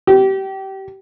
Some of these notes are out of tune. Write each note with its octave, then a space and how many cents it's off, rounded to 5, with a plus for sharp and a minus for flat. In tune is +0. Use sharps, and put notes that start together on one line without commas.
G4 -25